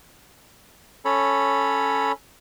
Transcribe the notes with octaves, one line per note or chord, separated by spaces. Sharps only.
C#4 A4 C#5 B5